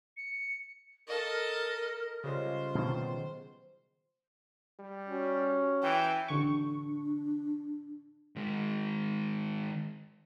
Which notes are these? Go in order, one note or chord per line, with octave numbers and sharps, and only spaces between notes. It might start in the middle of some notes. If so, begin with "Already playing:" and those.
C#7
A4 A#4 D#5
C#3 G3 G#3 F4 C5
B2 D#3 F#3
G3
C#4 F#4
E3 G5
A1 D3 D4 C#6
D#3 G#3